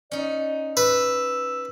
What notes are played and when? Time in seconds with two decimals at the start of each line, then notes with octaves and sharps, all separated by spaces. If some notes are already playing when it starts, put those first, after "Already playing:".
0.12 C#4 D#4 D5
0.77 B4 E6